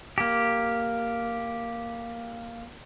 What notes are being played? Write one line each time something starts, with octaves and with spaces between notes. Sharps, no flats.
A#3 G4